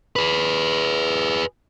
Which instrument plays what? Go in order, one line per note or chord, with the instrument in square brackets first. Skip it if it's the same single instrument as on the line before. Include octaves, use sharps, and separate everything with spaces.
[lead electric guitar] G#4 B4